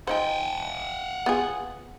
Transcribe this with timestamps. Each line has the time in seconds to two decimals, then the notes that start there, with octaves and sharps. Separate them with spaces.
0.07 F3 D#4 C5 F#5 G5
1.26 B3 F4 G#4